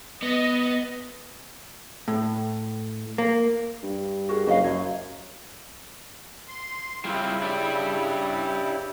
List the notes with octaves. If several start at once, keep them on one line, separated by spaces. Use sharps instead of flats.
B3 D#5
A2
A#3
G2
F#4 G#4 A#4
F#1 F#4 D#5 F5
F#2 C#5
C6
C#3 G3 E4 F4 G4
D4 G4 D5